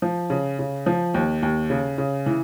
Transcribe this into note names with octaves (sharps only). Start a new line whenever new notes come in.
F3
C#3
C#3
F3
D#2
D#2
C#3
C#3
E3